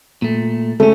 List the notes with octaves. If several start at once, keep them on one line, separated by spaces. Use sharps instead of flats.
A#2 A3
C#2 A3 C#4